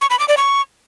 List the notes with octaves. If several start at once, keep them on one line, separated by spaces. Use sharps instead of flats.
C#6
B5
D6
D5
C#6